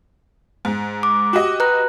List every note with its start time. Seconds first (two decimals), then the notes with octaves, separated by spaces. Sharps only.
0.65 G#2
1.03 D6
1.33 F#4 G4 D#5
1.60 B4 A#5 F#6